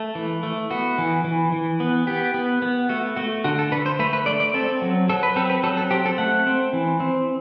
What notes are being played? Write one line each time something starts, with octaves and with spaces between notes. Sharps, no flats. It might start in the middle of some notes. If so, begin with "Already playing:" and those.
Already playing: A3
E3
A3
B3 F#4
E3
E3
E3
B3
B3 G4
B3
B3
A3 F#4
A3 F#4
D3 F#4
A4
D3 B4
C5
A3 B4
B4
A3 D5
D5
C4 A4
F#3
F#3 A4
B4
C4 A4
B4
F#3 A4
A4
C4 G4
A4
A3 F#5
C4
E3
C4